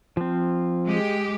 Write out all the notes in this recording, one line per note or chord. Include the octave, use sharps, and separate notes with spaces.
F3 C4
G#3 G4